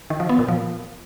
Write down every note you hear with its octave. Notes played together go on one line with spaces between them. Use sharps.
D#3
F3
B3
A#2
F3